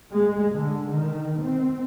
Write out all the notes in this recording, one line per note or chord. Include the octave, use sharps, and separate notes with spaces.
G#3
D3
D#3
C4